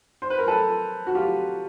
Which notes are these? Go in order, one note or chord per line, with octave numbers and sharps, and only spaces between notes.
C5
B4
A#4
A4 B4
F#4
F4 G4